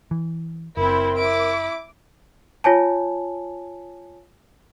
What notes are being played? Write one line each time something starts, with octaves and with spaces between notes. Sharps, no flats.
E3
F#1 C4 E4 A#4
E4 D6
F4 C#5 G#5 A5